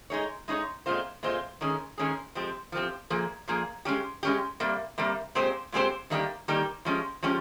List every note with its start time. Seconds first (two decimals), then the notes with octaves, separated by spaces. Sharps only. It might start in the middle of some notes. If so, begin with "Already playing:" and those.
0.10 G#3 D#4 G#4 C#5
0.48 G#3 D#4 G#4 C#5
0.86 A#2 G#3 C4 F4 C5
1.23 A#2 G#3 C4 F4 C5
1.61 D#3 G#3 C#4 G#4
1.98 D#3 G#3 C#4 G#4
2.35 F3 G#3 C4 G4
2.72 F3 G#3 C4 G4
3.10 A#2 F3 A#3 G#4
3.48 A#2 F3 A#3 G#4
3.85 G#3 C#4 G4
4.23 G#3 C#4 G4
4.60 C3 G3 A#3
4.98 C3 G3 A#3
5.35 A#2 G#3 C4 G4 C5
5.72 A#2 G#3 C4 G4 C5
6.10 D#3 G3 A#3 D#4 G4
6.48 D#3 G3 A#3 D#4 G4
6.85 F3 G#3 C#4 G4
7.23 F3 G#3 C#4 G4